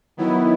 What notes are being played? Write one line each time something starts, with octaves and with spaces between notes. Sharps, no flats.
D#3 F#3 B3 E4